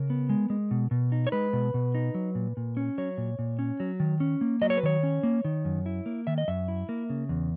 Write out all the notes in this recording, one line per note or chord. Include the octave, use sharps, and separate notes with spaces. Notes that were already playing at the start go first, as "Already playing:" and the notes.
Already playing: C#3 A#4
B3
G#3
G#3
B2
B2
D#4
C#5
G#3 B4
B2
B2
D#4
F#3
A#2
A#2
C#4
F#3 C#5
A#2
A#2
C#4
F#3
D#3
C#4
A#3
F#3 D#5
C#5
B4
D#3 C#5
C#4
A#3
D#3
F#2
E4
A#3
D#3 E5
D#5
F#2 E5
E4
A#3
C#3
E2